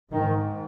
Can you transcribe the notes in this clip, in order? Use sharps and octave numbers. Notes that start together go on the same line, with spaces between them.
G#2 D#3